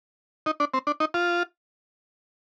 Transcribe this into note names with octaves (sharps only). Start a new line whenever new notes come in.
D#4
D4
C4
D4
D#4
F4